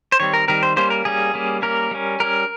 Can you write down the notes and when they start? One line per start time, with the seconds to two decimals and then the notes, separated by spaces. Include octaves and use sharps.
0.12 C5
0.20 D#3 G3 C4 C#5
0.33 A#4
0.48 D#3 G3 C4 A#4
0.63 C5
0.77 G3 A#3 C#4 C5
0.90 A#4
1.05 G3 A#3 C#4 G#4
1.34 G3 A#3 C#4
1.62 G3 A#3 C#4 A#4
1.91 G3 C#4
2.20 G3 C#4 A#4